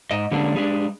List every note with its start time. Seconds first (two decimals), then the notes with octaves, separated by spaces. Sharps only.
0.11 G#2 D#5
0.31 D3 G3 G#3 A#3 C#4 D4
0.55 G3 G#3 D4